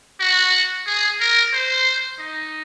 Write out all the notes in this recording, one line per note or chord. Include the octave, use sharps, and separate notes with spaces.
F#4
G#4
A#4
C5
D#4